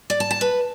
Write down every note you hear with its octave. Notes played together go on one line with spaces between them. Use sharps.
D5
A5
A5
B4